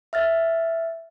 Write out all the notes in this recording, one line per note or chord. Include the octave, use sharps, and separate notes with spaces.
E5 F6 A6